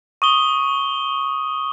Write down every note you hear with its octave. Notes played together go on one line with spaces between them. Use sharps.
C#6 D#6 G7